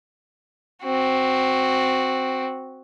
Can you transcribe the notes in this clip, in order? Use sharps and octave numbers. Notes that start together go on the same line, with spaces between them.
C4 F#4